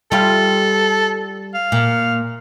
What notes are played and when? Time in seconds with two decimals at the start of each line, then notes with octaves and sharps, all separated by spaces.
0.12 G3 F4 A4
1.55 F5
1.72 A#2